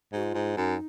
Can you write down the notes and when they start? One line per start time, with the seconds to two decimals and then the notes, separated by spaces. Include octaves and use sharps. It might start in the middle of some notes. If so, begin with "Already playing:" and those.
0.13 G#2 F#4
0.23 F4
0.34 G#2
0.57 F#2 D#4